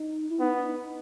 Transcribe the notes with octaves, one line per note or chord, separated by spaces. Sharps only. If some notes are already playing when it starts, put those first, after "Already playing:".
Already playing: D#4
E4
B3 D#4
D4
D#4